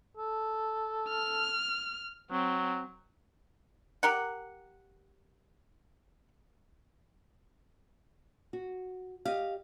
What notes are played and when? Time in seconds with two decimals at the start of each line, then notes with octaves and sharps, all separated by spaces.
0.17 A4
1.09 F6
2.31 F#3 C4
4.03 G4 A#4 F#5
8.53 F#4
9.25 G4 D#5 F5